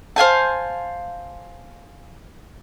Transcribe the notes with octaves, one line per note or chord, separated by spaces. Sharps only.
C5 F5 G#5 A5